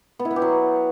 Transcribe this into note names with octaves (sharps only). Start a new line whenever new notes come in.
B3
E4
B3
G4
F#3